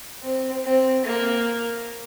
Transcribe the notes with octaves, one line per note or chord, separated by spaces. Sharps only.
C4
C4
A#3